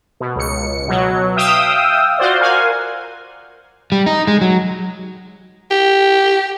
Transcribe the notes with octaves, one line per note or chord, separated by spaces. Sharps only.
B2
C#2 C#7
B2 F#3
E5 F5 G5 D#6 E6
F4 F#4 C5 D5
A#4 F5 F#5 G#5
G3
D#4
G#3
F#3
G4